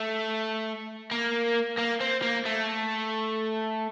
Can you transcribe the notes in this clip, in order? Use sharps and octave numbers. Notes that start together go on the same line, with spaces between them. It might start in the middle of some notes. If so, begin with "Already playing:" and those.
Already playing: A3
A#3
A#3
C4
A#3
A3